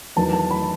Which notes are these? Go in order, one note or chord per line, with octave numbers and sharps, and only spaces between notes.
E2 D#3 F#3 A5
A5
B5